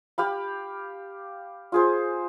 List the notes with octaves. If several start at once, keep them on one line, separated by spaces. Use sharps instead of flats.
G4 F5 B5
F4 G#4 C5